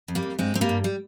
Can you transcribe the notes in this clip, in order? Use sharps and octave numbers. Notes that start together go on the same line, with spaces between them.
F2
G3 A#3
F2
G2 G#3 C4
G2 C4
G3 A#3
G2
G3